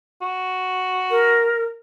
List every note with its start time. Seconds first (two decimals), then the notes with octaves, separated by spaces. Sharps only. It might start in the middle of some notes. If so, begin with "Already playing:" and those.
0.22 F#4
1.11 A#4